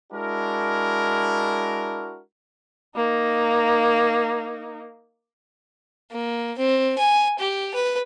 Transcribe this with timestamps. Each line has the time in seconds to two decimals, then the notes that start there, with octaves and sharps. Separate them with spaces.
0.13 G#3 D4 E4 F#4 A#4
2.95 A#3 D#4
6.11 A#3
6.58 C4
6.98 G#5
7.39 G4
7.74 B4